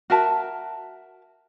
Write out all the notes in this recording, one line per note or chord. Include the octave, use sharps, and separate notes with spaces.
F#4 A#4 E5 A5